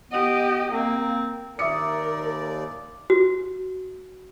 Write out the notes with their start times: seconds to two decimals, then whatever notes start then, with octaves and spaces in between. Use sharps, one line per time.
0.11 B3 G4 D#5
0.72 A#3 C4
1.59 D#2 A#4 D5 E5 D6 D#6 C#7
3.10 F#4